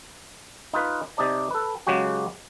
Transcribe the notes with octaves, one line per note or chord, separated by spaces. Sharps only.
D#4 F4 B4
C3 D#4 D5 A5
A4 B4
C#3 F#3 G#3 F#4 G4